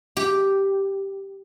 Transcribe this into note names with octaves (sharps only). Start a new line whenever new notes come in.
G4